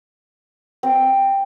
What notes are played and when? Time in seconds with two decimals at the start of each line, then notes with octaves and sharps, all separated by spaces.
0.83 C4